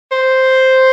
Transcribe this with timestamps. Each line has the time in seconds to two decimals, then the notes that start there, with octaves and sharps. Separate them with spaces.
0.12 C5